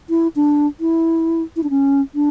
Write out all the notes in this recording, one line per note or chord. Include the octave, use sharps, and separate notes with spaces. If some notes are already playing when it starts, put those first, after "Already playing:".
E4
D4
E4
E4
D4
C#4
D4